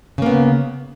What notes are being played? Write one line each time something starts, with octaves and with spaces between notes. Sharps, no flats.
C#3 A#3 B3